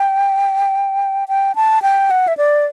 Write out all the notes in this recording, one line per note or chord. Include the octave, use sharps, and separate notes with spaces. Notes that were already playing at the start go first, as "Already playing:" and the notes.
Already playing: G5
G5
A5
G5
F#5
E5
D5